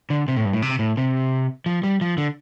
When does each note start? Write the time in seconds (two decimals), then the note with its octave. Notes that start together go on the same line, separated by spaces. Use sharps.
0.10 D3
0.28 C3
0.36 A2
0.45 G2
0.53 A2
0.62 C3
0.79 A2
0.97 C3
1.66 F3
1.84 G3
2.01 F3
2.18 D3